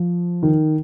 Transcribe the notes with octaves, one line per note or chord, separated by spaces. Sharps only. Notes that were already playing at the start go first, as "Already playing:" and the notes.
Already playing: F3
D#3